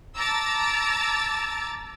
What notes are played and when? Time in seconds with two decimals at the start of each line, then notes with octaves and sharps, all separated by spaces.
0.17 A5 A#5 D6 E6 A6